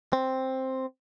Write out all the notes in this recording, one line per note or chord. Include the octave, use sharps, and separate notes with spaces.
C4